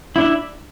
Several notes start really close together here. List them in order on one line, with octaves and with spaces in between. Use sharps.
E4 D4 E5